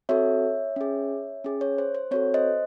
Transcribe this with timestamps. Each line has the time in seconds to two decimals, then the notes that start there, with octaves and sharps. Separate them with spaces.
0.09 C4 F#4 A4 C#5 E5
0.76 C#4 G#4
1.44 C#4 G#4
1.61 C#5
1.78 C5
1.95 C5
2.11 C4 F#4 A4 C#5
2.34 C5 D#5